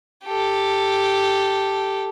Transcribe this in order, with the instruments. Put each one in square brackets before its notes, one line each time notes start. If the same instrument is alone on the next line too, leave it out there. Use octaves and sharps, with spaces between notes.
[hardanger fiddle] G4 A4